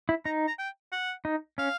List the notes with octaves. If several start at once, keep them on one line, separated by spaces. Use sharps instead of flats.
E4
D#4 A#5
A#5
G5
F#5
D#4
C#4 F5